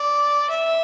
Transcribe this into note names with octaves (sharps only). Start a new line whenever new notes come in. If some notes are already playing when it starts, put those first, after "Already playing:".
Already playing: D5
E5